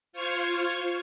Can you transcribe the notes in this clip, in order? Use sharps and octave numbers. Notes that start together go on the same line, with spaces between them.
F4 C5 C#6 F6 G#6